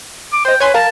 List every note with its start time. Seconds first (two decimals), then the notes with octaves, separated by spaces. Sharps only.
0.32 D6
0.45 C5 D#5 G5
0.60 B4 C#5 G#5 C6
0.74 A#4 F5 A5